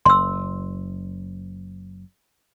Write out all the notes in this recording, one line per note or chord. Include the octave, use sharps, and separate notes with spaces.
F#1 C6 E6